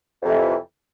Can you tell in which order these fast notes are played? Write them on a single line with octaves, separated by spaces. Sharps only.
F2 C3 E3